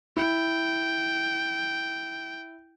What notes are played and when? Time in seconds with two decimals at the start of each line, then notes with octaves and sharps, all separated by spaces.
0.17 E4 G5